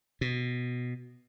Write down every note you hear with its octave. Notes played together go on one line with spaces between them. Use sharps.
B2